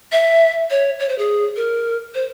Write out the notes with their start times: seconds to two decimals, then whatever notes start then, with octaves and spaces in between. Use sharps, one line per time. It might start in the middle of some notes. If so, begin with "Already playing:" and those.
0.12 E5
0.70 C#5
0.99 C#5
1.09 C5
1.18 G#4
1.56 A#4
2.15 C5